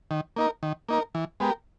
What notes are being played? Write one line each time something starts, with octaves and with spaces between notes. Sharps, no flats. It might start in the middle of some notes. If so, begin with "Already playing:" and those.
D#3
A#3 D#4 A#4
D#3
A#3 D#4 A#4
E3
G#3 B3 G4 A#4